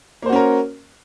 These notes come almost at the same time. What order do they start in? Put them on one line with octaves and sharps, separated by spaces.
A#3 C5 F#4 C#4 A#4